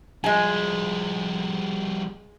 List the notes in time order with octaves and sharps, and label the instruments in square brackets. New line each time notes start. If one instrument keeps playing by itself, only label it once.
[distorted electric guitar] F3 G3 [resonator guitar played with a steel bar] G#3 G#5